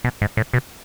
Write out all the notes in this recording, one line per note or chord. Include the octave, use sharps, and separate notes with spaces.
B2
G#2
A2
B2